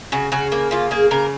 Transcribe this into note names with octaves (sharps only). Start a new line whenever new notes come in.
C#3 F#4
C#3 F#4
A#3
C#3 F4
A#3 G#4
C#3 A#4